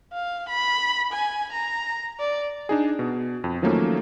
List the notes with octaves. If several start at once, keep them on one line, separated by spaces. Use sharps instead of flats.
F5
B5
G#5
A#5
D5
D4 D#4 G#4
B2
F2
D#3 F3 F#3 A3 A#3 C#4